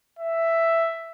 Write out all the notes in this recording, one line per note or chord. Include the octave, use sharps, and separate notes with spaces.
E5